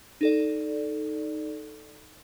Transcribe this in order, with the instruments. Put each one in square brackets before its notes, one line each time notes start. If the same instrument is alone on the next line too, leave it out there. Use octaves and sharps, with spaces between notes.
[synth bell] D#4 A4 D5